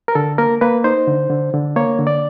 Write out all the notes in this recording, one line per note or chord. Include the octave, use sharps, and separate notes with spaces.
A#4
D3 A4
A#3 A#4
A#3 B4
D#4 C5
D3
D3
D3
A#3 C#5
D3
D5